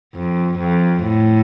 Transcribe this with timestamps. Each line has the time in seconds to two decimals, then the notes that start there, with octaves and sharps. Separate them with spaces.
0.15 F2
0.59 F2
1.04 A2